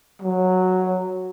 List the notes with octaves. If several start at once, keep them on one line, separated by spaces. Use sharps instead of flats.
F#3